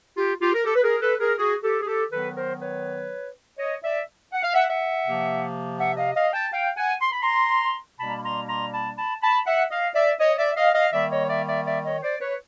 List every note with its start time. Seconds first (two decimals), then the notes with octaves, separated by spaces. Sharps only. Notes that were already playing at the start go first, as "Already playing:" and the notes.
0.16 F4 G4
0.41 F4 G4
0.54 A#4
0.64 G4 A4
0.75 B4
0.83 G#4 A#4
1.01 A4 B4
1.20 G#4 A#4
1.38 F#4 G#4
1.62 G4 A4
1.82 G#4
1.87 G4 A4
2.11 D#3 F#3 B3 A4 B4
2.36 A#4 C5
2.61 B4 C#5
3.58 C#5 D#5
3.83 D5 E5
4.33 F#5
4.43 F5
4.54 E5 F#5
4.68 E5 F#5
5.06 C3 F3 A#3
5.79 E5 F#5
5.97 D#5 F5
6.15 D#5 F5
6.33 G5 A5
6.52 F5 G5
6.77 F#5 G#5
7.01 C6
7.12 B5
7.22 A#5 C6
7.99 B2 G3 A#3 D4 A5 B5
8.08 A#5
8.16 B5
8.23 A#5 C6
8.48 A#5 C6
8.72 A5 B5
8.97 A5 B5
9.22 A5 B5
9.46 E5 F#5
9.71 D#5 F5
9.95 D5 E5
10.19 C#5 D#5
10.38 D5 E5
10.56 D#5 F5
10.74 D#5 F5
10.93 D#3 G3 A#3 D5 E5
11.11 C#5 D#5
11.29 D5 E5
11.47 D5 E5
11.66 D5 E5
11.84 C#5 D#5
12.03 C5 D5
12.21 B4 C#5